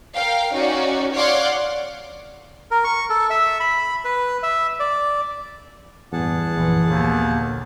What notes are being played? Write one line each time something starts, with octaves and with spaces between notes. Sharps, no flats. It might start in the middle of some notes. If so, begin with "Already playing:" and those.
A#4 F5 G5
C#4 D#4 F#4 D5
C#5 D5 F5 F#5 C6 D6
A#4
C#6
A4
E5
B5
B4
E5
D5
A1 E2 G2 G#4 F#5 A5
A#1 F#2 E3
A#1 D#2 D3 A#3